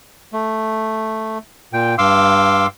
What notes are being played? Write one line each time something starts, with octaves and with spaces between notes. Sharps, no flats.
A3
A#2 G5
G2 F5 C6 D6 E6